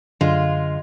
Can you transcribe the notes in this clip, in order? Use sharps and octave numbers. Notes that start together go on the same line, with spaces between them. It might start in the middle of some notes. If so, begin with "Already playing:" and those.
F#2 D3 G#3 F4